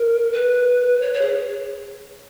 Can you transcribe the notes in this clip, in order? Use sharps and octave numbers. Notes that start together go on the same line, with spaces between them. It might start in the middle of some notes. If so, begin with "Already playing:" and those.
Already playing: A#4
B4
C#5
C#5
G#4